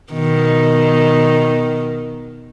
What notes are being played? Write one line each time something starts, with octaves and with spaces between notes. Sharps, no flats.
B2 D#3